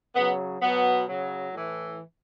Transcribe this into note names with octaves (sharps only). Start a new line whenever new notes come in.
C#3 F#3 B3
B2 F#3 B3
C#3 F#3
A2 E3